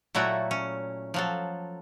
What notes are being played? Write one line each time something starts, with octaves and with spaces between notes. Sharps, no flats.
A#2 F#3 A3 E4 F#4
C#4
F3 F#3 A4